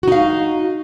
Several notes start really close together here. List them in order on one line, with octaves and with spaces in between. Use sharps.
F#4 D#4 F5